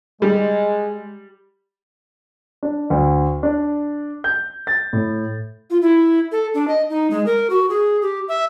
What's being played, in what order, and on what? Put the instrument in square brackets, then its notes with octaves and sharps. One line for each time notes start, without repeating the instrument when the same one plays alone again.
[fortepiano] G3 [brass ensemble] G#3
[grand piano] D4
D2
D4
G6
A6
A2
[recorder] F4
E4
A4
D4
D#5
D#4
G#3
A#4
F#4
G#4
G4
E5